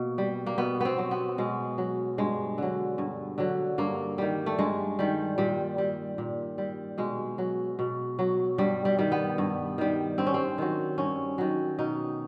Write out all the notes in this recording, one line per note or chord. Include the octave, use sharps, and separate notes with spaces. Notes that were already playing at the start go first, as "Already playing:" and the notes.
Already playing: B2 A#3
G3
A#3
B2 B3
B3 C4
F#3
B3
B2 G#3
F#3
G2 G#3
D3 F#3
G2
D3 F#3
G2 A#3
D#3 G3
A3
G2 G#3
D#3 G3
A#2 G3
G3
A#2
G3
B2 G#3
F#3
B2
F#3
G2 G3
G3
D#3 G3
B3
G2
D#3 G3
G2 C4
C#4
C4
D#3 F#3
G2 C#4
D#3 F#3
B2 D#4